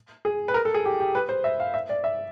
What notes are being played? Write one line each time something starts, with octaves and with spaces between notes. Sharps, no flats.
G#4
B4
A#4
A4
G#4
G4
G4
B4
C5
E5
F5
E5
D5
E5